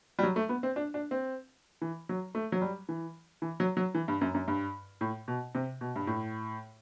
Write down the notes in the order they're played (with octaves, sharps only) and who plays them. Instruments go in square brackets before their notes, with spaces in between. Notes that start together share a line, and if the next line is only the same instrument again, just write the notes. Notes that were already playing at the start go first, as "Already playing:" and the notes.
[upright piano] G3
F#3
A3
B3
C4
D4
D4
C4
E3
F#3
A3
F#3
G3
E3
E3
F#3
F#3
E3
G2
F#2
F#2
G2
A2
B2
C3
B2
G2
A2